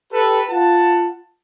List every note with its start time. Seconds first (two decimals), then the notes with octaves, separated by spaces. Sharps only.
0.12 G4 A4 B4
0.49 F4 F#5 A5